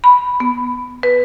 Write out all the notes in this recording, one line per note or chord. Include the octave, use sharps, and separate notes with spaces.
B5
B3
B4